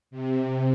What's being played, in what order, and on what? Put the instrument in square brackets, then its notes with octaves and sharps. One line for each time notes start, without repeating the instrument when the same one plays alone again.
[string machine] C3